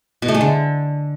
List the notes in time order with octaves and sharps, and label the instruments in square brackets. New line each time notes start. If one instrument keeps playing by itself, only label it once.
[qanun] B2
A3
G#3
D3